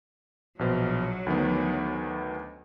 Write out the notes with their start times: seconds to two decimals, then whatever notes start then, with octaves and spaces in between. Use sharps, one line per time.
0.59 A#1 B2 F#3 C5
1.26 D2 D#3 B3